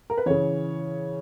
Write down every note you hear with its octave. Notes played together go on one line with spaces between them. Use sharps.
A#4
B4
C#3 E3 C#5